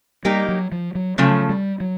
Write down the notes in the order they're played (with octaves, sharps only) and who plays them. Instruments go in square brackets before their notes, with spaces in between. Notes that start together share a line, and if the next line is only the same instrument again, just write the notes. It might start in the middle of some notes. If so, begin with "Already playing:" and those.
[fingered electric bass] G3 [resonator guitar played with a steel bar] A#3 D#4 G4 A#4
[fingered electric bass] F#3
F3
F#3
[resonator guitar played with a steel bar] C#3 F3 A3 [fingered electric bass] F#3
[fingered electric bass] G3
F#3